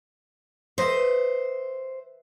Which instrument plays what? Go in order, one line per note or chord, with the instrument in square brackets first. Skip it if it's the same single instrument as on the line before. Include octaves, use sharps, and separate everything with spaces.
[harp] B4 D#5 E5 [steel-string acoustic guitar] C5